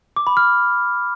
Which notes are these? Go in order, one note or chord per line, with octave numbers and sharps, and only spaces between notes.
D6
B5
F6